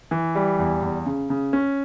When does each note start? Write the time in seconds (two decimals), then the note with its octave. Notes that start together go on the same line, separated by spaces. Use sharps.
0.11 E3
0.35 G3
0.59 E2
0.82 E2
1.06 C#3
1.30 C#3
1.53 C#4